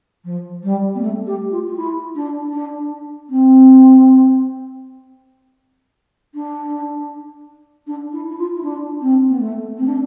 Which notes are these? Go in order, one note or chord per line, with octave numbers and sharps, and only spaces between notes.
F3
G3
B3
A3
G4
F4
F4
E4
D4
D4
C4
D4
D4
E4
E4
F4
E4
D4
C4
B3
A3
C4
D4